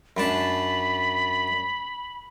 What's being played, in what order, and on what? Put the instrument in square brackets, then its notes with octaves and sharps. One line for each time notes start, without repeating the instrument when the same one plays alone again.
[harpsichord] F#2 D4 A5 [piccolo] B5